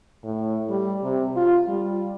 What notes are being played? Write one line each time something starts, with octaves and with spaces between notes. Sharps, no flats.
A2
G3
C3
F4
G3